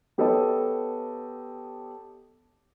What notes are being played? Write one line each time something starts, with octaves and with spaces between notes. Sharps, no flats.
B3 G4 A4 C#5 D#5 A5